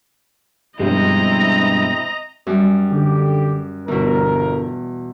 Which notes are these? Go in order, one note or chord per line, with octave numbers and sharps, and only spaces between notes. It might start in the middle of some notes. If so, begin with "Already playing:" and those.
G2 B2 F3 G#3 C4 E4 D#5 A#5
F#2 G3
D3 G4
G1 E2 B2 A#4